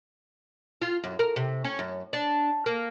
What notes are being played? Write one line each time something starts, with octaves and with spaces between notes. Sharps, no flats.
F4
F#2
A#4
C3
C#4
F#2
D4
A#3